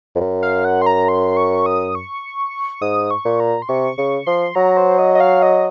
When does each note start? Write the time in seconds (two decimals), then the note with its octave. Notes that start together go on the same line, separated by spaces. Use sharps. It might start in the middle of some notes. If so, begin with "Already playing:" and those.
0.15 F2
0.20 F#2
0.43 F5
0.65 F#5
0.82 C6
0.86 A#5
1.08 C6
1.37 C#6
1.66 D#6
1.95 C#6
2.81 G#2 D#6
3.11 C#6
3.25 A#2
3.40 A#5
3.62 C6
3.69 C3 C#6
3.98 C#3 C#6
4.26 F3 C6
4.55 F#3 A#5
4.77 C5
4.99 D#5
5.15 D#5
5.20 F5
5.42 D#5